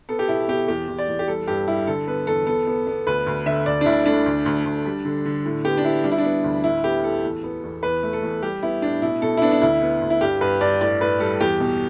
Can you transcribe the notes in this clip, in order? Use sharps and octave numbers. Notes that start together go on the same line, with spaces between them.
B3 A4
G4
B2 E4
B2 G4
E2 G4
E2
D5
E2
G4
G3 A4
G2 G4
G3 E4
D3 A4
B3 B4
E2 A4
B3 A4
B3
B3
D2 B4
D2
D3 E5
D2 D5
D4
D2 E4
A3 D4
D2
D2
D2
G3
D3
D3
A2
B3 G4
D4
B3 E4
G3 D4
E4
D4
B3
D2
A2 E4
B3 G4
A2 A4
E2
B3
E2
E2 B4
A3
A4
E2
G3 G4
B3 E4
A2 D4
B2 E4
B2 A4
E4
B3 D4
D4
D2 E4
B3
D2
E4
G2 G4
G2 B4
G2 D5
A2 D5
A2 B4
G3 A4
E2 G4
B2